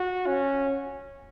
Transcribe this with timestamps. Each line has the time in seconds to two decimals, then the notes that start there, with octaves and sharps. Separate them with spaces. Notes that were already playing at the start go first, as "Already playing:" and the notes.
Already playing: F#4
0.26 C#4